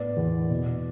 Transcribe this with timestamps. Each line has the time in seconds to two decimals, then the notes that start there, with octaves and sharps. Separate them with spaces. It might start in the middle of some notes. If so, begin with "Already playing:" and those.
Already playing: A2 B3 D5
0.17 E2
0.50 B2